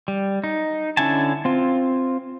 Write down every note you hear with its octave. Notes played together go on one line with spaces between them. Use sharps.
G3
D#4
D3 C#4 E4 G#5 A5
C4 F4